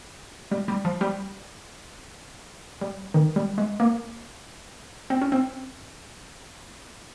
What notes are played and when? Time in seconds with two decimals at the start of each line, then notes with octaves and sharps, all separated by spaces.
0.51 G3
0.68 G3
0.85 F3
1.01 G3
2.81 G3
3.14 D#3
3.36 G3
3.58 G#3
3.80 A#3
5.10 C4
5.22 C#4
5.32 C4